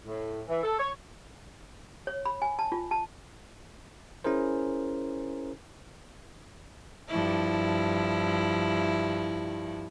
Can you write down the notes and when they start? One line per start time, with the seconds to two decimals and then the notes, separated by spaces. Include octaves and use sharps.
0.04 A2
0.47 E3
0.62 A4
0.78 C#5
2.07 C#5
2.25 B5
2.42 G#5
2.59 A5
2.72 F4
2.91 A5
4.24 C#4 E4 G#4 A#4 C5
7.08 G2 F3 E4